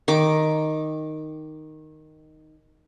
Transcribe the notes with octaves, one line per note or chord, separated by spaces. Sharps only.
D#3 D6